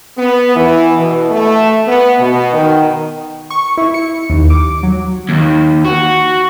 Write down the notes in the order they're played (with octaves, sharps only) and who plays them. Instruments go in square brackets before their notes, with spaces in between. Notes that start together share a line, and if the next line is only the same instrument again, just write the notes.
[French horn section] B3
E3
B2
A3
B3
B2
D#3
[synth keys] C#6
E4
C#7
D#2
D6
F#3
[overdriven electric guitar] D#2
F#4